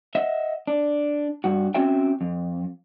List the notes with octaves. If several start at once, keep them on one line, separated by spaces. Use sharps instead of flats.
D#5 E5 F#5
D4
G2 F#4
C4 C#4 F#4 E5 G5
F2